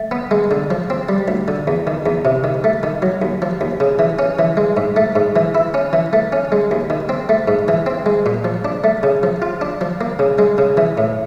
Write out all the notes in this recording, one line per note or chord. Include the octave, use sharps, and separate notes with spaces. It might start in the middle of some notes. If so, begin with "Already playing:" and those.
Already playing: A3
B3
G#3
D3
F3
C4
G3
D2
D3
E2
D#3
E2
C3
D#3
A3
D#3
F#3
D#2
F3
D#2
C#3
E3
C#4
E3
G#3
G#2
A3
G#2
E3
E4
C#4
E3
A3
C#4
G#3
D#2
D#3
C4
A3
G#2
E3
C4
G#3
A#2
F3
D4
A3
C#3
F3
F4
D4
F3
A#3
C#3
G#3
C#3
E3
A2